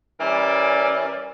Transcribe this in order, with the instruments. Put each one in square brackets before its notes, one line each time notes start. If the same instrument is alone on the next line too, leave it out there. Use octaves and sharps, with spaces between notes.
[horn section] E3 G3 C#4 A#4 D5